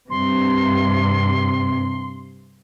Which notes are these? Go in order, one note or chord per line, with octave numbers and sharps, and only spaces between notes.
G2 C3 C6